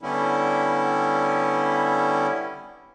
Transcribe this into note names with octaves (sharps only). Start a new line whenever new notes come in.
D3 G3 B3 C#4 E4